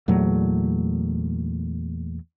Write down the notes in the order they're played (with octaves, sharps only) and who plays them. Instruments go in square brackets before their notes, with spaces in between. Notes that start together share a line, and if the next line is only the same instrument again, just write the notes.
[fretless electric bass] E2 A#2 F#3 A3